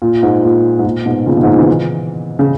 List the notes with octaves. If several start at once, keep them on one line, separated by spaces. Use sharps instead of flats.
A#2
G#2
A#2
G#2
A#2
G#2 B2
A#2 C#3
B2 D#3
G#2
A#2
C#3 E3
C#3